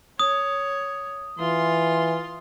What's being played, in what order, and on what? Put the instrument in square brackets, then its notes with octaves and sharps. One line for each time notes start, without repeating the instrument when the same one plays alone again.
[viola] C#5 [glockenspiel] D#6
[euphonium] E3 [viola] F4 C6